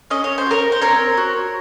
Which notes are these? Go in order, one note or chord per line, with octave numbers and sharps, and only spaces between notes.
C#4 D#5
C#5
C5
F#4
A#4 C#5
C5
C4 A#4 C#5
F#4